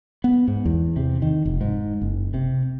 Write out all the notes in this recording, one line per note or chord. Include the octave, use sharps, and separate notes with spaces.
B3
G#2
E2
C3
D#3
F1
G#2
F#1
C3